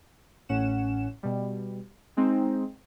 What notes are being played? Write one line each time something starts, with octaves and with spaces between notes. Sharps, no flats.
A1 A2 C#4 F#5 E7
B2 G3
G#3 C4 D#4